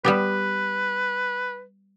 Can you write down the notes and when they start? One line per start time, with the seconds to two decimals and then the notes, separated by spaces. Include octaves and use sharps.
0.05 G3 B3 G4 B4